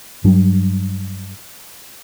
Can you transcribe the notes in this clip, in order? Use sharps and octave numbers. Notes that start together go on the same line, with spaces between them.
G2 F#3 G3 D4